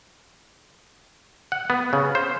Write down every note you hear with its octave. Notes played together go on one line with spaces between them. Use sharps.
F#5
B3
C#3
C5